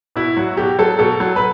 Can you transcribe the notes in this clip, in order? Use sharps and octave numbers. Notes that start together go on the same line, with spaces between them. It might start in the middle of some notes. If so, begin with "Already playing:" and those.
B2 E4
F#3 F#4
B2 G4
F#3 A4
B2 A4
F#3
B4